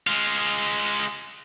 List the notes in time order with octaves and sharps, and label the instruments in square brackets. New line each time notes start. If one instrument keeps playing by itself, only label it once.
[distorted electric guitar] G#3 F4